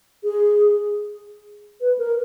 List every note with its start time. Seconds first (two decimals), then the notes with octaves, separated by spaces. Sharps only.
0.24 G#4
1.81 B4
1.98 A#4